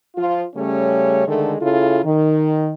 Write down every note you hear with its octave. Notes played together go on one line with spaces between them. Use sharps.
F3 F4
C#3 G3 A3 C#4 C#5
D3 D#3 G#3 A3
C#3 E4 F4 A4
D#3